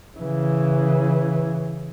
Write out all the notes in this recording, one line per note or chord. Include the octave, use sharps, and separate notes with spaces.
C#3 E3